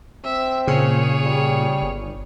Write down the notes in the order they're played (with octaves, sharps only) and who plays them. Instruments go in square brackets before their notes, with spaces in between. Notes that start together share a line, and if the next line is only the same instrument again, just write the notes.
[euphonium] C4 [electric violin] E5
[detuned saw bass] A#2 [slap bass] C#3 [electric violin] G#4 C#5
[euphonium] G3
[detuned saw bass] G1